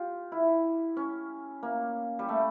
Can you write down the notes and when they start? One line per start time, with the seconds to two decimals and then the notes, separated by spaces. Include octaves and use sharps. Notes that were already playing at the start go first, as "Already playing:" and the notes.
Already playing: F4 G4
0.32 E4
0.97 C#4
1.63 A#3
2.19 G3
2.29 A3